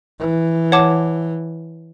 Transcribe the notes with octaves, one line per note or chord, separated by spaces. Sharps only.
E3
C#5 F#5 A5 D6